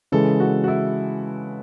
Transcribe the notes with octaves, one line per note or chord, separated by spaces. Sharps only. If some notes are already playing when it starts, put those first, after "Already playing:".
C#3 E3 G#3 A4
F#4
F#4
E4